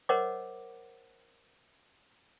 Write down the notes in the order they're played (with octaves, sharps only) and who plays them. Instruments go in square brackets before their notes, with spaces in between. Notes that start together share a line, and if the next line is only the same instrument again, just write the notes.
[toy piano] A#4 C5 C#5 D#5 F#5 D6